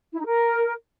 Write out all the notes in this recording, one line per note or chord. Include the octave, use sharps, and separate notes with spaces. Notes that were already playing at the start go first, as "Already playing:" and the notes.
E4
D#4
A#4